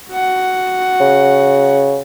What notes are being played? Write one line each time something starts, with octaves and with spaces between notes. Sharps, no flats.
F#4 F#5
C#3